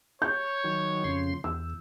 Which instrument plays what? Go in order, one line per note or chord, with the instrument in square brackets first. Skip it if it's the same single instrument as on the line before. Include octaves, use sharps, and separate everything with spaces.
[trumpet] C#5 [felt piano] G6
[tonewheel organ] D#3 F#3
F2 C#3 C6
[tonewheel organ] E2 [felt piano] E6